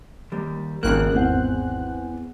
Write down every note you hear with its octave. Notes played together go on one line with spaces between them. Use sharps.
D#2 G3
G#1 C#3 G3 A#3 F#6
E2 C4 F#5